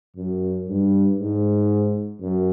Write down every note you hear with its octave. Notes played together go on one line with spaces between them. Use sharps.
F#2
G2
G#2
F#2